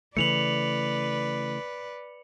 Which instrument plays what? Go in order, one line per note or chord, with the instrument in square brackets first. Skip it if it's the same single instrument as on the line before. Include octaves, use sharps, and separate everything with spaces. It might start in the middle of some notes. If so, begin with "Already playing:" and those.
[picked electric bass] C#3 E3 A3 [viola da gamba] B4 D5 [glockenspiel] C#7 F7 F#7